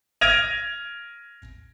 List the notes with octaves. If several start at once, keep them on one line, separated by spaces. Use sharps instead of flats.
F6 G#6 A#6 D7 D#7 F7